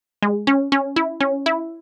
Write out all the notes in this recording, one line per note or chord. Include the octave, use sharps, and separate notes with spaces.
G#3
C#4
C#4
E4
C#4
E4